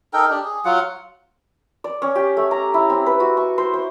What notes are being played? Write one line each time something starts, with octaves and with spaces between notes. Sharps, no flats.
D#4 A4 A#4 G5
D4 G4
G#4
F#3 F4 F#5
D5
C#4
G4
A3
A#5
E4
C4
B4
F#4
C#6
C5
C5